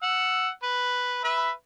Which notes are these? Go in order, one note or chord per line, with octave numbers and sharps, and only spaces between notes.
F#5 E6
B4
B4 E5 B5